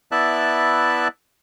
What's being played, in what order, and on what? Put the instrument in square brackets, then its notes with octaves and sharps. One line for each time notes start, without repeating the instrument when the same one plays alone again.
[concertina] B3 E4 D5 E5 A5 F#6